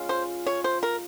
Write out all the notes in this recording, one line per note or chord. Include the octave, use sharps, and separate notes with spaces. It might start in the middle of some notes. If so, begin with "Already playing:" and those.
Already playing: G#3 C#4 F4
C5
C#5
C5
A#4